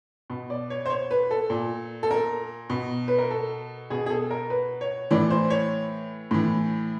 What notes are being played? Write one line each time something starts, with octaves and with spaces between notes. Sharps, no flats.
B2
D5
C#5
C5
C#5
B4
A4
A#2
A4
A#4
B2
B4
A#4
A4
B2 G#4
G#4
A4
A#4
B4
C#5
A2 E3 D5
C5
C#5
A2 E3